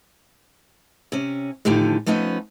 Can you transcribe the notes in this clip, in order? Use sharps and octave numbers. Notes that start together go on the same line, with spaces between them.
C3 C#4
A2 D3 D#3 F3 G4 G#5
F3 A3 B3 C#4 D#4